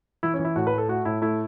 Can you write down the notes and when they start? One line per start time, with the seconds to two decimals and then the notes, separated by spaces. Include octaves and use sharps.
0.23 E3 E4
0.34 C#4
0.39 E3
0.45 E4
0.56 A2 F#4
0.67 B4
0.72 A3
0.78 A4
0.88 A3 F#4
1.05 A2 E4
1.22 A3 E4